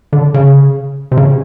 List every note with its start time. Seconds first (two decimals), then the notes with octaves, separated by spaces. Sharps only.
0.13 D3
0.34 C#3
1.12 C3
1.17 C#3